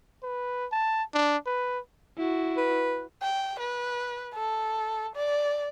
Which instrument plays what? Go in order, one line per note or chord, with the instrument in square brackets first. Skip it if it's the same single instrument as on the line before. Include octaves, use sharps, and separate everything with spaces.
[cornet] B4
A5
D4
B4
[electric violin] E4 F#4
[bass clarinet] B4
[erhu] G5
B4
A4
D5